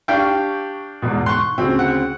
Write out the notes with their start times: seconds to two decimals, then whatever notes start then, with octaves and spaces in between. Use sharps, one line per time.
0.08 D4 G4 F5 G5 C#6
1.02 E2 G#2 B2
1.26 C6 C#6 F#6
1.58 D2 C#3 C4
1.79 F#5